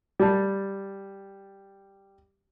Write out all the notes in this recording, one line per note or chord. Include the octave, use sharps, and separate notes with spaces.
G3 A5